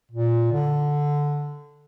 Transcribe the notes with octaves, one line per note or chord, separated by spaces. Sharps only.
A#2
D3